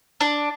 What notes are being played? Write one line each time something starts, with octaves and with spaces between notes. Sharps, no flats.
D4